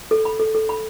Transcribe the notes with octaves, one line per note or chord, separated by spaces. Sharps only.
A4
B5
A4
A4
B5